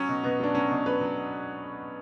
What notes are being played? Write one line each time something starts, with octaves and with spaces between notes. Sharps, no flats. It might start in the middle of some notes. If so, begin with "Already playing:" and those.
Already playing: F#3 C#4
B2
B2 B3
F#3 D4
F#3 C#4
B2
F#3 B4
F#3